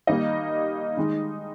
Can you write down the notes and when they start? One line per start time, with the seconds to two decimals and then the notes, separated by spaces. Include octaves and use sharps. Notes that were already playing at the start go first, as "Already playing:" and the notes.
0.07 D#3 G3 A#3 D#4 D#5
0.97 D#3 G#3